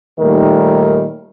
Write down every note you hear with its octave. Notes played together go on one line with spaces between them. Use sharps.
D#2 A#2 D#3 G3 A3 A#4